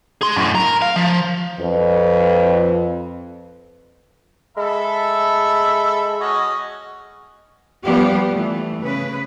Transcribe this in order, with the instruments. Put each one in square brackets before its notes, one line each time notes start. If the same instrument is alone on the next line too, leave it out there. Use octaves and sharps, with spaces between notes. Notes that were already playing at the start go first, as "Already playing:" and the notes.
[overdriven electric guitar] G#4 C6
F#2 A2
A#4
F5
F3
[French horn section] F2 B4
[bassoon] G#3 [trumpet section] A4 E5 B5
[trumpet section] C#4 F#4 D#5
[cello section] F3 G3 B3 G4
E3 A3
C#3 B4